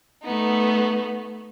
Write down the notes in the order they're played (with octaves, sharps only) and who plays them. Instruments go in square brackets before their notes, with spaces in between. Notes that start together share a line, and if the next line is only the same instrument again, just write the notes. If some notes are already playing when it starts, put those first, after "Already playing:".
[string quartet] A3 B3 D#4